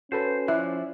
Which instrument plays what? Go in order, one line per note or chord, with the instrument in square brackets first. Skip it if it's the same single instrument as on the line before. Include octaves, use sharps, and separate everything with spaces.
[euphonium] C#4 [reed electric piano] F#4 A4 B4 [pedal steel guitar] C5
[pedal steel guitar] F3 D5 F#6 [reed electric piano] E4 [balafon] E5